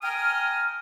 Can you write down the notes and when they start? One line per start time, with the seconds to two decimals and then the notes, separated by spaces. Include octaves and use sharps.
0.03 G5 G#5 A#5 D#6 F6